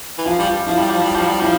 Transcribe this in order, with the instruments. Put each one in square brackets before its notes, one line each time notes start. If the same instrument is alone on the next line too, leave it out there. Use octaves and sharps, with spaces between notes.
[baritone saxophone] E3
[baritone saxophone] F3 [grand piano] F4
[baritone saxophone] G3
[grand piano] F4
[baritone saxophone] F3 [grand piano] E4
[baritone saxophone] G3
F3
G3
F3
G3
[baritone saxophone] F3 [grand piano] E4